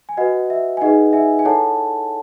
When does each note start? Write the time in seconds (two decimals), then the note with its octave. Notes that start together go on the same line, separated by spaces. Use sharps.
0.09 G#5
0.17 F#4 B4 D#5 F#5
0.50 E5
0.77 G#5
0.81 D#4 G#4 B4 D#5 F#5
1.13 E5 G#5
1.39 G#5
1.45 E4 A4 C#5 F#5 A5